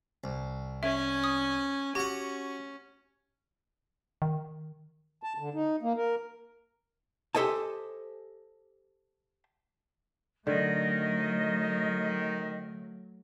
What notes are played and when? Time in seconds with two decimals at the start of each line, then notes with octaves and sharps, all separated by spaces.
0.24 C2
0.83 C#4 E5 G#5
1.24 D#6
1.95 C#4 F#4 G4 F#5
4.22 D#3
5.23 A5
5.38 D3
5.54 D#4
5.82 A#3
5.96 A#4
7.35 G4 A4 C5 D#5 G#5 A5
10.47 D3 D#3 F#3 A3 D#5